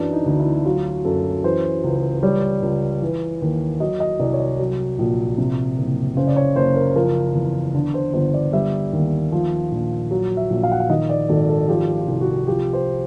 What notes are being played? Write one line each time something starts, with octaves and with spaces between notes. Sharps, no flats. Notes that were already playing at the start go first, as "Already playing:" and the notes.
Already playing: F#2 E3 F#3 D4
D#4
D2
E4
F#3 F4
F#2 A4
E3 C5
C#2
G3 C#5
C#2
E3
D#2
F#3 D#5
D#5
C2 D5
C#5
D5
F#3
A#1
C3
F#1
C#3 C5
D5
C#5
F#1 C5
A#4
F3 A#4
E2
D3
C5
G1 C5
D5
G3 E5
D#2
F3
A#1
F#3
E5
A#1
F5
F#5
F5
D#3 D#5
D5
G#1 A4
A4
F3 G4
F4
C2
F#4
F3 G4
C5